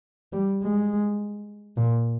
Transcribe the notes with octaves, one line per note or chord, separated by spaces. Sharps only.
G3
G#3
A#2